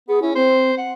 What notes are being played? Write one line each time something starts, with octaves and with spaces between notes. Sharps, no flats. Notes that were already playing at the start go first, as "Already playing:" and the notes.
B3 G#4
C#4 E4
C4 C5
F#5